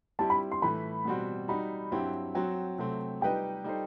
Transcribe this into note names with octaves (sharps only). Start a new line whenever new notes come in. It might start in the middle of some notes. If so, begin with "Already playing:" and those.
G3 C4 E4 G4 A5
B5
C6
A2 E3 A3 B5
B2 G3 C4 F#4
G3 D#4 F#4 B5
G2 F#3 C4 E4 G4
F#3 C4 F#4 G5
C3 F#3 A3 C4
G3 D#4 G4 B4 D#5 G5
G3 D#4 A4 C5